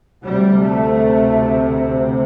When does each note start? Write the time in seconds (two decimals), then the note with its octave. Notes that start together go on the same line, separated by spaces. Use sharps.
0.24 D2 C3 G3
0.61 A3